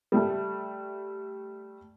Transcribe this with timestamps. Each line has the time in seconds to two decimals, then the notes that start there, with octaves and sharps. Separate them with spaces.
0.12 G3 A3